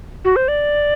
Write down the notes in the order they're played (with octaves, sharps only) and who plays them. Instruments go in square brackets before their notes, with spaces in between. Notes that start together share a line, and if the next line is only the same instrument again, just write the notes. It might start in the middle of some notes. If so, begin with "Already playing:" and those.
[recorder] F#4
C5
D5